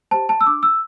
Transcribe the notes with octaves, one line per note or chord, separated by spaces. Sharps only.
G4 C5 A5
A5
E6
D4 D6
E6